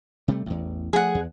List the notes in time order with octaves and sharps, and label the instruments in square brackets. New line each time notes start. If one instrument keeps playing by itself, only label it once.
[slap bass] C3 G3 A3
A1 E2
[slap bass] F3 A3 [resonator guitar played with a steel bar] G#4 F#5
[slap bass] E2